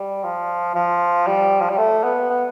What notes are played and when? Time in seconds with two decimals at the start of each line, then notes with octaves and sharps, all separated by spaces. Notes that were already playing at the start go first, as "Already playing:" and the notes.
Already playing: G3
0.24 F3
0.75 F3
1.27 G3
1.60 F3
1.70 G3
1.78 A3
2.04 B3
2.30 B3